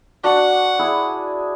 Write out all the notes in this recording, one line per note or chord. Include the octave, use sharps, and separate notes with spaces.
D4 F#4 F#5
E4 G#4